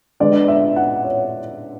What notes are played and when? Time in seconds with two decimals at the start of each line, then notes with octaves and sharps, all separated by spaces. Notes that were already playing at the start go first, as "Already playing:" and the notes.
0.20 D3 G#3 B3 D4 D5
0.48 E5
0.76 F#5
1.05 C#5